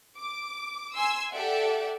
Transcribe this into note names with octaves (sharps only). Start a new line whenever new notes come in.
D6
G#5 C6 E6
G4 A4 D5 E5 F#5